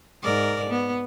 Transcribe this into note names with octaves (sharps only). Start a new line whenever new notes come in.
G#2 A#4 D5
B3